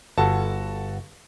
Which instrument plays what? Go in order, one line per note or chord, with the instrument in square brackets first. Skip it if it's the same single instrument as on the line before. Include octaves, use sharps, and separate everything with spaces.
[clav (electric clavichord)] G1 [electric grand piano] F#4 A4 A5